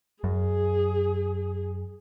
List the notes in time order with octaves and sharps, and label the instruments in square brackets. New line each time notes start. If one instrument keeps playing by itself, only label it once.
[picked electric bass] F#2 [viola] G#4